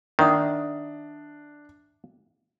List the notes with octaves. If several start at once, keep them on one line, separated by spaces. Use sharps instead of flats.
D#3 D4 E5 F#5 D#6